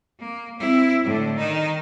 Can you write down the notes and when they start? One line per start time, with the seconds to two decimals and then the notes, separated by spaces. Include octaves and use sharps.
0.19 A#3
0.59 C4 E4
1.04 A2 D3
1.38 D#3 D#4